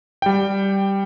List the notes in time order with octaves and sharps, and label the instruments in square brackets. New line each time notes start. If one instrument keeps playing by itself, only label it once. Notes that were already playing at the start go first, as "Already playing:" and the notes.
[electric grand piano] G3 G5